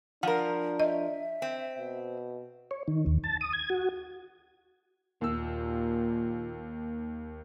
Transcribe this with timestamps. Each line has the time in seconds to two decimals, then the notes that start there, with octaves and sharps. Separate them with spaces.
0.23 F3 D4 A#4 F#5
0.80 D#5 E5
1.42 C4
1.78 B2
2.71 C#5
2.88 D#3
3.06 D#2
3.24 A5
3.41 D#6
3.53 G#6
3.70 F#4
5.21 D#2 A#2 E6